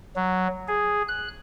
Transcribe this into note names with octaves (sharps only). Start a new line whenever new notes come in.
F#3
G#4
F#6